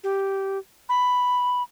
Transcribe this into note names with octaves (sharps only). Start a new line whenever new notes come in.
G4
B5